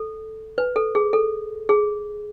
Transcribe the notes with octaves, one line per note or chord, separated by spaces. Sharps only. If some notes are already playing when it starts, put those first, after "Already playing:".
Already playing: A4
B4
A4
G#4
A4
G#4